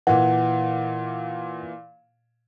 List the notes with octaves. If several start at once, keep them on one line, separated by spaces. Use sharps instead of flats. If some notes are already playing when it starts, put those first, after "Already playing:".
A#2 E3 F#5